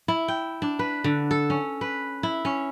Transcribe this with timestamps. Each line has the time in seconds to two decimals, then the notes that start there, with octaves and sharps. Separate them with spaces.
0.08 E4
0.28 G5
0.62 D4
0.79 B4
1.04 D3
1.31 A4
1.50 C#4
1.81 B4
2.23 E4
2.45 C#4